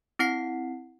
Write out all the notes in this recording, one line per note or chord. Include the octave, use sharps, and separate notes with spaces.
C4 E4 F#5 C7